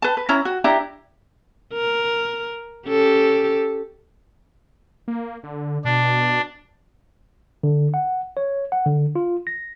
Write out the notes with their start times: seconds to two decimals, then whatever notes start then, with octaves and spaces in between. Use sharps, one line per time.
0.02 B4 A5
0.17 B4
0.29 C#4 E4 A#5
0.45 F#4
0.64 D4 E4 G4 A#5
1.74 A#4
2.88 C#4 G4 A4
5.08 A#3
5.43 D3
5.85 B2 D4
7.63 D3
7.94 F#5
8.37 C#5
8.72 F#5
8.86 D3
9.15 F4
9.47 A#6